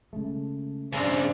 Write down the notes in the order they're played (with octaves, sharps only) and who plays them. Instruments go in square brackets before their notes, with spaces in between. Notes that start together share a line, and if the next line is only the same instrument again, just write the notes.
[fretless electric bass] C#3 G#3 A3
[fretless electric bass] G2 [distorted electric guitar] C#3 C4 [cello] D4